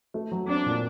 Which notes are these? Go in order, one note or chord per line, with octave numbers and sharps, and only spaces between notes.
A3
F#3
C4 D4
A#2